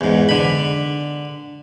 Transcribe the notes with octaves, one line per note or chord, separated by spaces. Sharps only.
E2 G#2
D3 B5